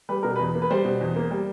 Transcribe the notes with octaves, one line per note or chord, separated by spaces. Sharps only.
G3 B4
B2 A#4
E2 B4
A#3
B4
G3 C5
B2
E2
A#3
G3